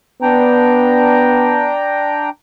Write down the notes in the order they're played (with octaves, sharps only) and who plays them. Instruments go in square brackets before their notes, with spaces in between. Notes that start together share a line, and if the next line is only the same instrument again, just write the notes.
[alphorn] B3 [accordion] D4 G5 A#5